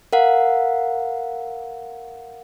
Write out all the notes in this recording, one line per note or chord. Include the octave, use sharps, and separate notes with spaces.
A#4 F5 F#5